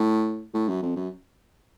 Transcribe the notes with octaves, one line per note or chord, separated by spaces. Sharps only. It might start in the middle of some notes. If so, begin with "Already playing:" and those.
Already playing: A2
A2
F#2
F2
F#2